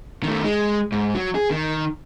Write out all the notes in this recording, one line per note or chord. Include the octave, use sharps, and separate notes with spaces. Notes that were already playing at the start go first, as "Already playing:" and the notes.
D#3 A3
G#3
G#2
F#3
G#4
D#3